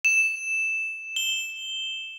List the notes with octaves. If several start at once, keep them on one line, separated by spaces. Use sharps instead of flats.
E7
G7